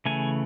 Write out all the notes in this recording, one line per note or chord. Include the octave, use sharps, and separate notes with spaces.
C#3 E3 A3 G#5